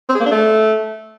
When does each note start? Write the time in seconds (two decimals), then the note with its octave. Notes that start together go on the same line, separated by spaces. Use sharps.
0.09 C4
0.15 G#4
0.20 A#3
0.26 D4
0.31 A3